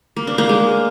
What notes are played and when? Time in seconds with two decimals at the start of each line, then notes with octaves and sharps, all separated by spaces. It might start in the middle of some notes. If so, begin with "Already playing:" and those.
0.16 A#3
0.27 D4
0.38 A#3
0.49 G#3